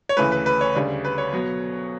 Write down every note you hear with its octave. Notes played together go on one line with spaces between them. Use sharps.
C#5
D2 C#3 E3 A3 B4
B4
B4
C#5
D2 C#3 G3 D4
B4
C#5
B2 F#3 B3